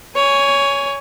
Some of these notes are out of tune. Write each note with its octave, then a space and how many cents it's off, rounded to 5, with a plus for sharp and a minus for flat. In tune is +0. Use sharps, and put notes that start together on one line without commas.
C#5 +15 G#5 +0